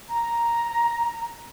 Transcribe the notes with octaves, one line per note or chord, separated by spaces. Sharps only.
A#5